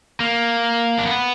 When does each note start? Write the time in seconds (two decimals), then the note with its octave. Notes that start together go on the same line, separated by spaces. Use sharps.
0.20 A#3
0.99 D4
1.06 B3